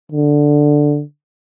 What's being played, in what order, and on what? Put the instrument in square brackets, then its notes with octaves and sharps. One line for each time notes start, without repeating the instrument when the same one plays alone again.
[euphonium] D3